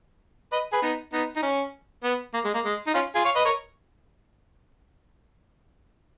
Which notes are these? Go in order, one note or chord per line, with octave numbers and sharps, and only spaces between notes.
B4 D#5
G#4 B4
B3 D#4
B3 D#4
D#4
C#4
B3
A#3
G#3
A#3
G#3
D#4
C#4 F4
F4 G#4
C#5 F5
B4 D#5
A#4 C#5